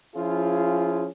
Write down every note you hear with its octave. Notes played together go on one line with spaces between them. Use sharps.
F3 C#4 E4 F4 G#4